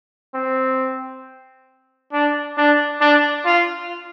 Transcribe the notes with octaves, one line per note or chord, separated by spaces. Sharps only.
C4
D4
D4
D4
F4